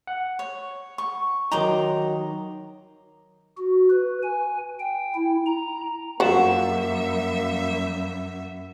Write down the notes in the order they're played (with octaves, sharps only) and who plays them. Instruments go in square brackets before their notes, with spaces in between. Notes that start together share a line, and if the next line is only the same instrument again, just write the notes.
[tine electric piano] F#5
[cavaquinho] C#5
C#6
[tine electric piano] D#3 F#3 D#4 [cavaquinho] A#5 C6 D6
[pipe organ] F#4
B4
G#5
G5
E4
A#5
[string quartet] F#2 E5 [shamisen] F3 F#4 [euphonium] A#3 [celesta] F#5 E7